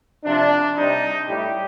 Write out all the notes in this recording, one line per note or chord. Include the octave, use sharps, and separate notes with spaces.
C3 F3 D4
C3 G3 D#4
A2 G3 G4